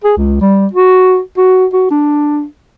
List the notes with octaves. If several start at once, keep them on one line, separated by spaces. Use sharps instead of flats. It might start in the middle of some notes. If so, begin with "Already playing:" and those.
G#4
C#2
G3
F#4
F#4
F#4
D4